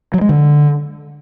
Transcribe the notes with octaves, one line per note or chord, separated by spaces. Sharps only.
F#3
G#3
D3